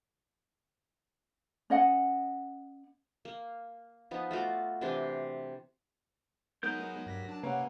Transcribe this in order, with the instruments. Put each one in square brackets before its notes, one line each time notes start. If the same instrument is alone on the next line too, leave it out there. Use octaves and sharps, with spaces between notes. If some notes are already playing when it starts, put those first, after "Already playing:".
[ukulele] C#4 D#5 F#5
[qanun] A#3
F3 B3 D#4
A3 F4 F#4 D6
C3 E3 D4 C5
[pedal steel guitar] F#3 A#4 G6 [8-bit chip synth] G#3 B3 D#4
[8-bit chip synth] G2 A#6 B6
D4 A5
[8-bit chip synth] C3 C#4 [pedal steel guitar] A#3 [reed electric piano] B4 C#5 F#5